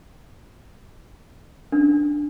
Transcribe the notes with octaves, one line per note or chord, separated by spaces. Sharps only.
D4